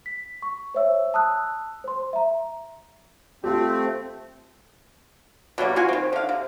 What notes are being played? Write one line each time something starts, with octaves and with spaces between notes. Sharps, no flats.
B6
C#6
C5 C#5 E5 E6
A5 D#6 E6 F#6
C5 C6
E5 A#5
A3 C4 F4 G4
B2 F#3 G3 A#3
E3 F4 F#4 G#5
D#3 C4
D3 F5
C3